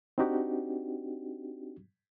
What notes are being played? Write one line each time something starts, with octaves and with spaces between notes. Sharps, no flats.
C4 D4 D#4 F#4 G4